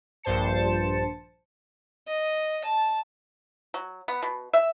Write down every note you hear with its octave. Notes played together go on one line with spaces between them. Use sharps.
A#1 G2 C5 A5 C#7
D#5
A5
F#3
B3
B2
E5